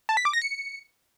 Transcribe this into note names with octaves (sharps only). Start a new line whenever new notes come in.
A5
B6
D6
A#6
C#7